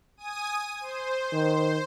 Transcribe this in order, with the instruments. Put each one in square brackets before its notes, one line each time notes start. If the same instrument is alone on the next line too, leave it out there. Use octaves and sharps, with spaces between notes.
[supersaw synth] G#5 D#6 D#7
C5
[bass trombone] D#3